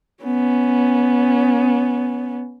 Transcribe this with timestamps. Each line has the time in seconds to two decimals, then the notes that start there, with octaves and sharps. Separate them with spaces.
0.23 B3 C#4